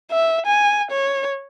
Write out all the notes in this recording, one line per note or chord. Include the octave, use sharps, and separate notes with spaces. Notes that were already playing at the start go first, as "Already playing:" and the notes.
E5
G#5
C#5